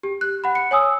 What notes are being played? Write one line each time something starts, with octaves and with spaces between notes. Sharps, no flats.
G4
F#6
F#5 B5
C#7
C#5 G#5 D#6 E6